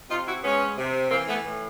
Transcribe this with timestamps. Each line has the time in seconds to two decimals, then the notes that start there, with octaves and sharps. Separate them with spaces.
0.09 C3 D#4 F4
0.27 E4 F#4
0.43 G#3 B3 C#4
0.78 C3
1.10 E3 A#3 C4
1.28 A3 B3
1.44 A2